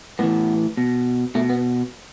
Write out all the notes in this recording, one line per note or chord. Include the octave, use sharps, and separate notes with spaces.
A2 E3 B3
B2
B2 A3
B3